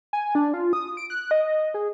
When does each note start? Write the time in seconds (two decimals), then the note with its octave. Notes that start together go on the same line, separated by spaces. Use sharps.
0.13 G#5
0.35 D4
0.54 F4
0.73 D#6
0.97 D7
1.10 F#6
1.31 D#5
1.74 G#4